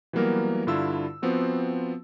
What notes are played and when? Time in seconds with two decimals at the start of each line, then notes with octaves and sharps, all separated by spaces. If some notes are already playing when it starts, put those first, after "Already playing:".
0.13 E3 F#3 G3 A#3 B3 A#4
0.67 G2 D3 E4 F4 E6
1.22 F3 B3 C4 F#4